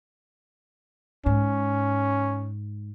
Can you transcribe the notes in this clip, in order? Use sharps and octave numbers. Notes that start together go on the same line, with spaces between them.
G#2 C#4